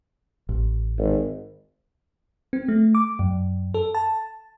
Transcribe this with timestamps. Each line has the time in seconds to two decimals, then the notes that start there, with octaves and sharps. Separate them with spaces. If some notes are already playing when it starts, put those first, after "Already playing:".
0.49 A1
0.98 G#1
2.53 C4
2.68 A3
2.95 D6
3.19 F#2
3.74 A4
3.95 A5